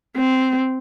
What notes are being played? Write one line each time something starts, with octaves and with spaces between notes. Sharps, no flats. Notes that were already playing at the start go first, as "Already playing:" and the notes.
C4